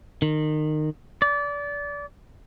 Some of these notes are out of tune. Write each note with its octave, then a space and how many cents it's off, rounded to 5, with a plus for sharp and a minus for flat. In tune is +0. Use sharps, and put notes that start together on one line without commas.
D#3 -25
D5 -25